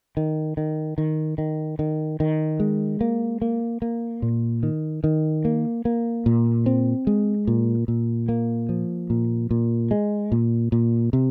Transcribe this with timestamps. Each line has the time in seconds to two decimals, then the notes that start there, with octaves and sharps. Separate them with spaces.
0.17 D#3
0.57 D#3
0.98 D#3
1.38 D#3
1.79 D#3
2.20 D#3
2.60 G#3
3.01 A#3
3.42 A#3
3.82 A#3
4.22 A#2
4.63 D#3
5.04 D#3
5.45 A#3
5.85 A#3
6.26 A#2
6.66 C4
7.07 G#3
7.47 A#2
7.88 A#2
8.29 A#3
8.69 F3
9.10 A#2
9.51 A#2
9.91 G#3
10.32 A#2
10.72 A#2
11.13 C3